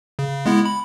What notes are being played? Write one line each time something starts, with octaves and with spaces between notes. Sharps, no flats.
C#3
G#3 B3 E4
B5